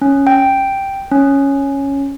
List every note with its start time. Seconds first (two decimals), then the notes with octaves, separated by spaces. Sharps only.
0.02 C#4
0.27 G5
1.11 C#4